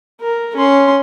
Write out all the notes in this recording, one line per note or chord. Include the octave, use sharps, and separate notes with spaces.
A#4
C#4 C6